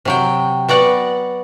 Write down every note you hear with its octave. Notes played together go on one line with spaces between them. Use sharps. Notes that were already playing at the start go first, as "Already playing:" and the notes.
C3 F#3 G5
B3 F#4 D5 F#5